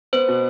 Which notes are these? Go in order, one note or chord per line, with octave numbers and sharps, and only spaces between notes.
B3 C5
B2